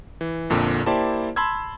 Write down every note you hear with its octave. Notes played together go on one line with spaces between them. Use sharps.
E3
A#1 F2 A#2 D3
A#3 E4 G4 C5 D5 A5
A5 B5 C6 E6 G#6